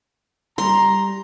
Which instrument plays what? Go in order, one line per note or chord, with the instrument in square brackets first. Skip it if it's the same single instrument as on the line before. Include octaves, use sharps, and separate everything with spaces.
[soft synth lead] G3 [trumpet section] A#5 [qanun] C6